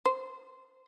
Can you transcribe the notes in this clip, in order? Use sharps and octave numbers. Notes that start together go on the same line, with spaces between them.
C5